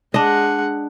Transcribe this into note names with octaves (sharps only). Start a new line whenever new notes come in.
G#3 D4 D#5 F#5